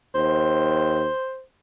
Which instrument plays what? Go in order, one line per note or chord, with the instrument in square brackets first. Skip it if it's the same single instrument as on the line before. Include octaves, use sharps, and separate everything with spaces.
[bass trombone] D#2 [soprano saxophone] C5